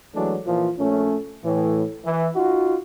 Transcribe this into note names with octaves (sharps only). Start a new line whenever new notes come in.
E3 F#3 G#3 A3 D4
A#2 E3 F3
A#1 A3 C#4
A2 E3
E3
D#4 F4 F#4